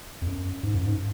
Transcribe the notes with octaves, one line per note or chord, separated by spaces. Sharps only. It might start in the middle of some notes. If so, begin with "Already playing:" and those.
F2
F#2
G#2
F#2
G#2